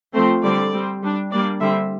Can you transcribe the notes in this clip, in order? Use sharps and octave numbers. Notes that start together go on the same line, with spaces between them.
F3 A3 C4 C5
D3 G3 C4 D5
G3 C4
G3 D4
G3 A#3 D4 D5
D3 G3 C4 E5